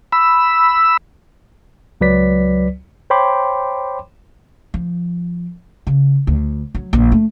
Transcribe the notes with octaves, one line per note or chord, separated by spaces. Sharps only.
B5 E6
C#2 F#3 B4 D5 B6
C5 C#5 G5 B5 C6 D6
F3
C#3
D2
F#3
A#1
A3